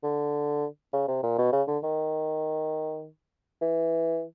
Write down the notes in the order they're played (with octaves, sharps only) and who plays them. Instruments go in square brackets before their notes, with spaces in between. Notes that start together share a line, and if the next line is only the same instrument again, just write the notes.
[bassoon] D3
C#3
C3
A#2
B2
C#3
D3
D#3
E3